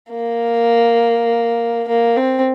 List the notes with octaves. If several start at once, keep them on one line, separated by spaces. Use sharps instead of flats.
A#3
A#3
C4